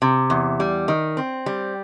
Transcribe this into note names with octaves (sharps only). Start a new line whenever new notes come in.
C3
E2
G3
D#3
C4
G3